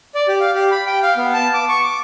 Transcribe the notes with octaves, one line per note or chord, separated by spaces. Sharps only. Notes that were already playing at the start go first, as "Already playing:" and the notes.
D5
G4
F5
G4
B5
G5
F5
B3
A5
D6
C#6
D6